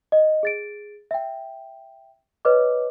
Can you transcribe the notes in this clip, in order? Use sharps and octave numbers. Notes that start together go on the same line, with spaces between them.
D#5
G#4 A6 D7
E5 G5
B4 C#5 D#5 D6